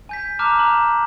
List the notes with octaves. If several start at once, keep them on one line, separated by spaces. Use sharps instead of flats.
G#5 G6 B6
A5 A#5 D6 F6 F#6
A#5 F6 E7 F#7